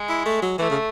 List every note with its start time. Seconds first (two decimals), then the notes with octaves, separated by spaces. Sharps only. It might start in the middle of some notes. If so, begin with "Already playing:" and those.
Already playing: G#3
0.09 E4
0.26 A3
0.42 F#3
0.59 E3 A3
0.70 C#3